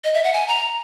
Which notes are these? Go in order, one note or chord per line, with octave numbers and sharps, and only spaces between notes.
D#5
E5
F#5
G#5
A#5